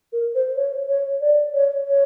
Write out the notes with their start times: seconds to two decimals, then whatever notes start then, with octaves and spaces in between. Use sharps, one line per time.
0.13 A#4
0.35 C5
0.56 C#5
0.88 C#5
1.21 D5
1.54 C#5
1.87 C#5